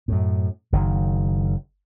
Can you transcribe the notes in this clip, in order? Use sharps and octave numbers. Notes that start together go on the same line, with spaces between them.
F#2 A2
F#1 D#3